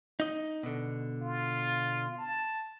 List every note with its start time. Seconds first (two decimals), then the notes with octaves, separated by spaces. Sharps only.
0.20 D#4 D#5
0.63 B2 D3
1.21 F4
2.18 A5